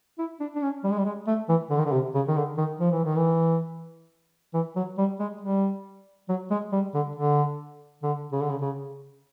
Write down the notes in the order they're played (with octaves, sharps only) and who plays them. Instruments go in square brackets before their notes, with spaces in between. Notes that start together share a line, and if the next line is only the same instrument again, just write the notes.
[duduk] E4
D4
D4
C#4
G3
G#3
G3
G#3
A3
E3
D3
D#3
D3
C3
C#3
D#3
D3
D#3
F3
E3
D#3
E3
E3
F#3
G3
G#3
G3
F#3
G#3
G3
D3
D3
D3
C#3
D3
C#3
C#3